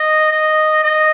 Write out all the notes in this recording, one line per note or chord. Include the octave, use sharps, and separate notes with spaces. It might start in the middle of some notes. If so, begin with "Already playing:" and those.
Already playing: D#5
D#5
D#5